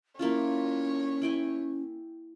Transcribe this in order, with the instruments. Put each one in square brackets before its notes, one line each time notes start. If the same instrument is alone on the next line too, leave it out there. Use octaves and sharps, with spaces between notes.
[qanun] A#3 E4 F4 [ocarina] C#4 [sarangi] C#5
[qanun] E4 G5 G#5